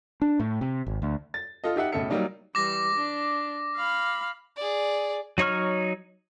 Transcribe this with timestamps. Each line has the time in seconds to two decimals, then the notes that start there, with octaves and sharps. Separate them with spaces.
0.22 D4
0.40 A2
0.61 C3
0.87 G#1
1.02 D2
1.34 A6
1.64 F4 A4 D#5
1.76 D#4 G4 E5 F#5
1.92 B1 A2 C#3 A4 E5 C#7
2.10 F#3 G3 A#3 D#4 D5
2.55 E3 G3 D6 A#6
2.95 D4
3.75 F5 B5
4.56 G#4 D5
5.38 F#3 D#4 C#5 C#6 F6